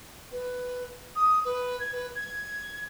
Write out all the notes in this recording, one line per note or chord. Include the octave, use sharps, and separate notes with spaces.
B4
D#6
B4
G#6
B4
G#6